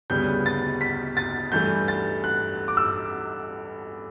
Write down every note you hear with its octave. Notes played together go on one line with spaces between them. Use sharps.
D2 C#3 G3 B3 G6
A6
B6
A6
G2 E3 A3 G6
A6
F#6
D6
E6